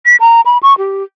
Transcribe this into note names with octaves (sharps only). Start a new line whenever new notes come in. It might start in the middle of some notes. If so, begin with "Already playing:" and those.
B6
A#5
B5
C#6
G4